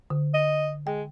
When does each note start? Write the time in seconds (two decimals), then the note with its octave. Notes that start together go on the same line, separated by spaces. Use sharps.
0.10 D3
0.34 D#5
0.87 G#3 G5